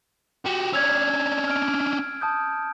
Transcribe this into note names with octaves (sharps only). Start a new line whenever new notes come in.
F#4 G4
C#4 D4 E6 G#6
F6 D7
A5 D#6 G6